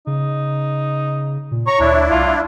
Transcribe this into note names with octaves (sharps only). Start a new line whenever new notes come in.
C#3 D#4
A#2
C#5 A#5 C#6
D2 D4 E4
C2 F4